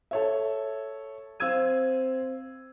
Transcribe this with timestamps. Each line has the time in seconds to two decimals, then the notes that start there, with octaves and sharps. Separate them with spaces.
0.11 A4 C#5 E5
1.40 C4 F5 E6 G#6 D#7